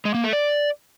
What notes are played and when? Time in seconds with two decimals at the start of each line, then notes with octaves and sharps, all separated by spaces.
0.05 G#3
0.14 A#3
0.24 A3
0.33 D5